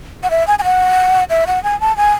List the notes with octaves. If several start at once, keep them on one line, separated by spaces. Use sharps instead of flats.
F#5
E5
G#5
G#5
F#5
E5
F#5
G#5
A5
G#5